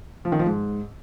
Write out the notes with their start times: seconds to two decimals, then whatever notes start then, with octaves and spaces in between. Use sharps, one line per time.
0.25 F3
0.32 D#3
0.39 F3
0.46 G#2